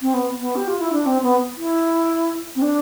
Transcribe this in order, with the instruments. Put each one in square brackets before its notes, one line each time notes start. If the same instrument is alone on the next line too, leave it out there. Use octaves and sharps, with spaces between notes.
[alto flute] C4
B3
B3
G4
F4
E4
D4
C4
B3
E4
C4
D4